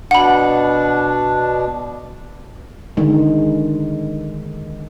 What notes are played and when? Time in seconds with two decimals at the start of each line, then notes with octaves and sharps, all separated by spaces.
0.11 B2 D4 F#5 B5
2.97 D3 D#3 G#3